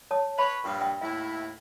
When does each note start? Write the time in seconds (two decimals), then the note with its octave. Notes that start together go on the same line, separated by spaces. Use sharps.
0.11 C#5 A5 D#6
0.38 B4 C#5 E5 B5
0.64 G2 A#2 C#6 D#6
0.81 E5 G5 D#6
1.01 D#2 A2 E4 E5